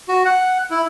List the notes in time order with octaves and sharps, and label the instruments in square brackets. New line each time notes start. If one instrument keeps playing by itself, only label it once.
[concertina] F#4
F#5
E4